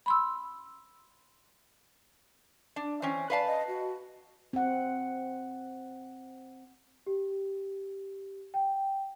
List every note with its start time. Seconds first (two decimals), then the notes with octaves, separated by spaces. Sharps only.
0.06 B5 C6 E6
2.76 D4
3.02 E3 C4 C#4
3.30 B4 D5 F5 A5
3.47 D#5
3.68 F#4
4.53 C4 F#5
7.06 G4
8.54 G5